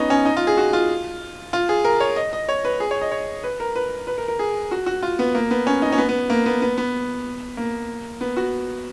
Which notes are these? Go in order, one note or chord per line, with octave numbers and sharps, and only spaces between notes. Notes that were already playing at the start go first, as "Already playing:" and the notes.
Already playing: B3 C#4 D#4
C#4
D#4
F4
G#4
F#4
F4
F4
G#4
A#4
C#5
D#5
D#5
C#5
B4
G#4
C#5
D#5
C#5
B4
A#4
B4
B4
A#4
A#4
G#4
F#4
F#4
F4
B3
A#3
B3
C#4
D#4
C#4
B3
B3
A#3
B3
B3
B3
A#3
B3
F#4